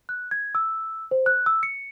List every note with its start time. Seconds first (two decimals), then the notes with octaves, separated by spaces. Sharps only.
0.09 F#6
0.31 G#6
0.55 E6
1.11 C5
1.26 F#6
1.46 E6
1.63 C#7